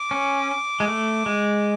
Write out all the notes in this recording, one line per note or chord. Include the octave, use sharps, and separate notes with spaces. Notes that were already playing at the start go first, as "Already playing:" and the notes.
Already playing: D6
C#4
G#3
A3
G#3